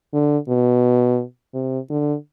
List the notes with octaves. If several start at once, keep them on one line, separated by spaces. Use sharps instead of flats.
D3
B2
C3
D3